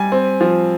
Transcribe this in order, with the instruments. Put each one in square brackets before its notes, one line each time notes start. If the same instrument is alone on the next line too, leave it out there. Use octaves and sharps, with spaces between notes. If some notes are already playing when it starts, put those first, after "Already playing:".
Already playing: [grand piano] G3 G#5
C4
F3